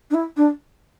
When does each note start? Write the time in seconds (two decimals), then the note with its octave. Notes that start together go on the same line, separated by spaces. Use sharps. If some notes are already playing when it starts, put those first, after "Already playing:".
0.10 D4
0.14 E4
0.36 D4